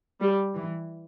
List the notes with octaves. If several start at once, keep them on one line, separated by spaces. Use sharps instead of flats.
G3
E3